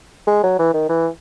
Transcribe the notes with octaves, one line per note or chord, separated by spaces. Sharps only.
G#3
F#3
E3
D#3
E3